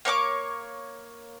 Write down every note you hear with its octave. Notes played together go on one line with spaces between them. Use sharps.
A#3 C#5 C#6 D6